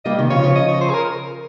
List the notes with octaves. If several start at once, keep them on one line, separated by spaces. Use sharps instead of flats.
G3 A#3 D#5
C3 D#3
C#3 F3 C#5
C#3 F3
D#5
C#5
C5
G#4
A#4